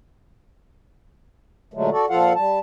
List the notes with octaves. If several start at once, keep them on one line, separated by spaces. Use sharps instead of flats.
A#2 D3 F#3 G#3 A3
F#4 A4 D5
A#2 F3 F4 A4 F5 F#5
G3 A5